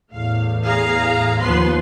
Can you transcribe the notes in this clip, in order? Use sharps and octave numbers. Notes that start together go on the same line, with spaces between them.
E2 A2 F5
G#4 F5 A#5
D#2 F3 B3 B4 C6